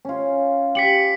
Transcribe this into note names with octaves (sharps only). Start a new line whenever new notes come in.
C#4 F4
G4 B6 C#7 F#7